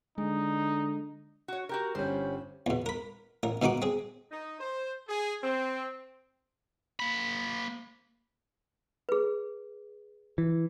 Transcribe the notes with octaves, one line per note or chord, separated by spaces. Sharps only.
D3 G#3 D#4
F#4 C#5
F#4 G4 A#4
G1 G3 C#4 C5
E2 B2
A#4 B5
A1 A#4
B2 D#3 D#4 F#4 D6
C4 G#4
D#4
C5
G#4
C4
A#3 B5
G#4 B4
E3